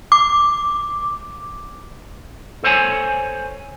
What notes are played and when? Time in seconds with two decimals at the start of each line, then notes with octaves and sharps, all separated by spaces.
0.12 D6
2.64 A4 C5 C#5 G5 G#5